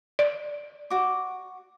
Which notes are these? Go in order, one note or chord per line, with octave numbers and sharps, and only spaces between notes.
D5
F#4 D6